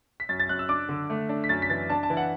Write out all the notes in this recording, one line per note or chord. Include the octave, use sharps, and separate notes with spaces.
B6
F#2 A6
A6
F#2 F#6
E6
D4 D6
D3
A3
D4
B6
F#2 A6
B6
E3 A6
D4 A5
A5
E3
F#5